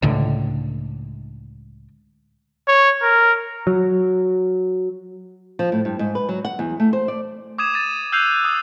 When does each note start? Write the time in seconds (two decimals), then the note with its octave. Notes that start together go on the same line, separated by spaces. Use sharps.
0.02 C#2 A2 D3
2.68 C#5
3.03 A#4
3.67 F#3
5.59 F3
5.72 A2
5.85 G2
5.99 G#2
6.15 B4
6.29 F#3
6.45 F#5
6.59 E2
6.80 A3
6.93 C5
7.08 D5
7.58 D6 D#6 G#6 D#7 E7
7.74 A6 D#7
8.12 E6 F#6 G6 C7 D#7 F7
8.44 D#6